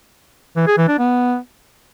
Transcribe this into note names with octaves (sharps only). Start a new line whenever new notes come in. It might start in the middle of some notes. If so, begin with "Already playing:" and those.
E3
G#4
E3
D4
B3